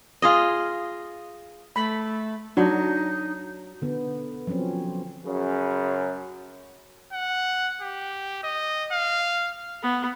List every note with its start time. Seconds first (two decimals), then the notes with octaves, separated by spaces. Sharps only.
0.22 F4 G#4 D#5
1.76 A3 B5
2.57 F#3 D4 D#4
3.82 D3 B3
4.47 F3 F#3 C4 C#4
5.25 F#2 C#3
7.13 F#5
7.81 G4
8.43 D#5
8.92 F5
9.83 B3